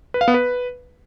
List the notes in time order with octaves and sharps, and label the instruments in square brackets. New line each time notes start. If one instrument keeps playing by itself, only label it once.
[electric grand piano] B4
F5
B3
B4